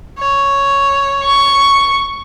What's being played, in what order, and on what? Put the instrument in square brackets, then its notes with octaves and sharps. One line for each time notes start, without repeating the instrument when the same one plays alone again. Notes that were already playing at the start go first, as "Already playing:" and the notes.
[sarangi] C#5
[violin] C#6